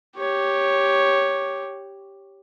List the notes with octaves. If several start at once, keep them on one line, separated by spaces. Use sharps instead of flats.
G4 C#5